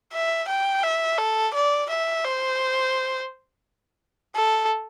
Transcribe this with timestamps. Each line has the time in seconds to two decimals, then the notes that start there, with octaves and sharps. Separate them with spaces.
0.13 E5
0.48 G5
0.83 E5
1.18 A4
1.54 D5
1.89 E5
2.24 C5
4.36 A4